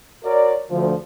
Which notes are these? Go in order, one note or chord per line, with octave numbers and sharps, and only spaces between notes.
F#4 A#4 C#5 D5
D2 F3